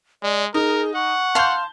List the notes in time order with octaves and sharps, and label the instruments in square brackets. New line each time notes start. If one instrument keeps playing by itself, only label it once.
[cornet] G#3 [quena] D5
[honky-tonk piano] D#4 [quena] G#4 [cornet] A#4
[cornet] F#5 [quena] C#6
[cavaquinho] F5 C6 [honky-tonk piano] A5 G6